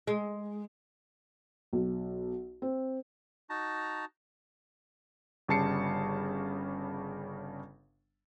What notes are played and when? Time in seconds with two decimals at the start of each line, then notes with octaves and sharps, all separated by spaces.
0.07 G#3
1.73 B1
2.62 C4
3.50 D#4 F#4 A5 A#5
5.48 G1 C#3 G3 A5 C7 C#7